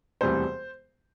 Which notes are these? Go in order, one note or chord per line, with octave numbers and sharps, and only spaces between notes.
E1 D2 C3 E3 G3 C5